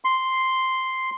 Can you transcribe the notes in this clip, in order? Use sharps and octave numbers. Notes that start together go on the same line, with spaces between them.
C6